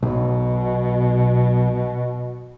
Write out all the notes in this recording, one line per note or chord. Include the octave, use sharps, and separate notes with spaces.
B1 B2